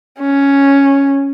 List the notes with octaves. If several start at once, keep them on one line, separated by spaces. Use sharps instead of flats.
C#4